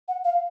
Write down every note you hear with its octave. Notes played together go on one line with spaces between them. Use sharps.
F#5
F5